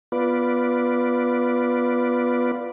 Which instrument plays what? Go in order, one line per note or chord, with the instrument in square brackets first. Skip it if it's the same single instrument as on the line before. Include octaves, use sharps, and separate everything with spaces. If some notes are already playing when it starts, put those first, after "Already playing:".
[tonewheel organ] B3 F4 B4 D5